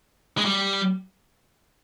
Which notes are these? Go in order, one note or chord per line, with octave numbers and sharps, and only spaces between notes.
G#3
G3